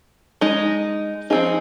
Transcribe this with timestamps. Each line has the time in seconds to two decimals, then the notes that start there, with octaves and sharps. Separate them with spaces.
0.41 G#3 D#4
1.30 F3 C4 D#4 G#4